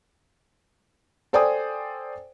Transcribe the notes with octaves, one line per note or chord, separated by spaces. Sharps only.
A4 C5 D5 G5 G#5 D#6